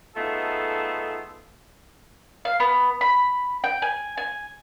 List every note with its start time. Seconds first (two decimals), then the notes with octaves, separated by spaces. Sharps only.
0.16 A3 B3 D#4 F4 G#4 A4
2.45 F5
2.60 B3
3.01 B5
3.64 G5
3.82 G#5
4.17 G#5